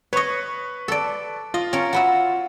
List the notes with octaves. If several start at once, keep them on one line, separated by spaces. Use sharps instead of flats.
B4 C#5 D#5 C#6
A4 D5
F4 D#5
C#4 A#4
F#4 B4 E5